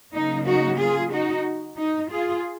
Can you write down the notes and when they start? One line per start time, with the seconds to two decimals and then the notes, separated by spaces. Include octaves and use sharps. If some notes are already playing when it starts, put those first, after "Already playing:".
0.13 C#3 F#3 A#3 D#4
0.46 D#4 F#4
0.79 F4 G#4
1.12 D#4 F#4
1.78 D#4
2.11 F4 G#4